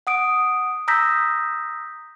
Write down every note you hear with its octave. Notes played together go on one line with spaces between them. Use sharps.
F#5 D#6 D7
A#5 D#6 E6 G6 A#6 B6